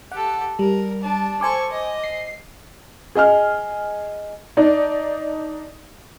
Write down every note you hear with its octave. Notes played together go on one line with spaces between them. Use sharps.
G4 A4 F#5
G3 A#4
D4 A5
A4 C5 G#5 C#6 D6
D#5
C7
G#4 D#5 G#5 F6
D4 D#4 D5